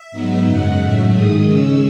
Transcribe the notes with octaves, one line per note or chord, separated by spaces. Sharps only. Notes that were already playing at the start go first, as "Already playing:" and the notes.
Already playing: E5
G#2 F#3 B3 D#4
F#2 C#3 G#3 D#4 F#5
A2 F#3 A3 E5
G#2 D#3 G#3 D#6
C#3 G#3 C#4 E6